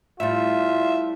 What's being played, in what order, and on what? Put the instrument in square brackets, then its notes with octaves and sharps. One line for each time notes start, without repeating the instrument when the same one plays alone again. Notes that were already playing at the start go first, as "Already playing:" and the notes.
[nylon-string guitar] A2 G3 [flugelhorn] F4 [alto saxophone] E5